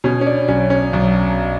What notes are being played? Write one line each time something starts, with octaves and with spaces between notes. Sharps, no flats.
B2 C#4
C#4
D4
B1 C#4
C#4
B1